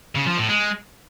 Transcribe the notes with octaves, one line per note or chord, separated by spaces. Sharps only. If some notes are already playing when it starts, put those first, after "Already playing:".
C#3
F3
A2
G#3